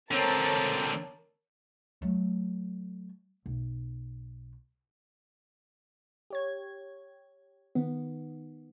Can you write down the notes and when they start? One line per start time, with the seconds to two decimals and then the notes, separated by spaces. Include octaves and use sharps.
0.11 D3 C4 A#4 C#5 A5
2.02 F#3 A3
3.46 B1
6.30 G4 C#5 G#6
7.75 D#3 B3